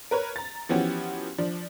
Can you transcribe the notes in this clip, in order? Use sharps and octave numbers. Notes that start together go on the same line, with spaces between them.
A#4 B4 C#5
A#5 A6
E3 F3 B3 C#4 F#4 G4
F3 D4